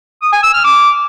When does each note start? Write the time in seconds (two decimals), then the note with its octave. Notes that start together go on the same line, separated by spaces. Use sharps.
0.22 D#6
0.33 G#5
0.43 E6
0.53 F6
0.64 D6